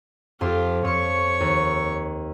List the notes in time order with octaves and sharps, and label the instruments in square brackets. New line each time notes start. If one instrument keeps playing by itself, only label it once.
[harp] F2 C6 [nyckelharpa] F4 G4
[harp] F2 [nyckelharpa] C#5 C#6
[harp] D#2